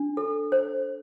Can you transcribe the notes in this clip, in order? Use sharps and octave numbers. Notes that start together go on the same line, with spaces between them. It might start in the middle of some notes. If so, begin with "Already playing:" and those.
Already playing: D4
A4
C5